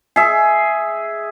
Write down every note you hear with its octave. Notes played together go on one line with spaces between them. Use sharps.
G#4 E5